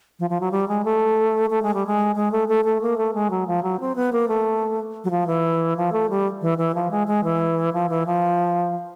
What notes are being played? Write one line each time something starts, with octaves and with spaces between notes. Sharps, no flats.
F3
F3
F#3
G3
G#3
A3
A3
G#3
G3
G#3
G#3
A3
A3
A3
A#3
A3
G#3
F#3
F3
F#3
C4
B3
A#3
A3
F#3
F3
E3
F3
A3
G3
E3
E3
F3
G#3
G#3
E3
F3
E3
F3